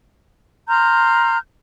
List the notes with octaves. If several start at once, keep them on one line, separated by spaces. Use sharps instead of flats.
A#5 C6 F6 G6